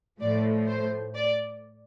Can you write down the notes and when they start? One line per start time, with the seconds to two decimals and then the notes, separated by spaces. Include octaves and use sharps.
0.22 A2 F3 A3 D5
0.69 C5
1.15 D5